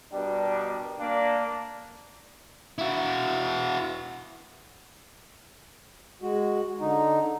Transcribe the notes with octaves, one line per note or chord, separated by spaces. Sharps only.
B2 G3 D4 A#4
A#3 D4
E4 F#4
G#3 F#4
D3 D#4